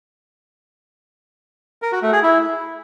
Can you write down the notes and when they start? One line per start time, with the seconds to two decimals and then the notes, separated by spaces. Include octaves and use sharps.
1.82 A#4
1.92 F#4
2.02 A3
2.13 G#4
2.23 E4